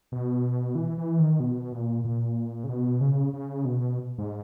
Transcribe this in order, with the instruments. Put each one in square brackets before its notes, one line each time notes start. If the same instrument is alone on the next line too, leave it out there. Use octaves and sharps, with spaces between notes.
[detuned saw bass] B2
E3
E3
D#3
B2
A#2
A#2
C#3
B2
C#3
C#3
B2
G#2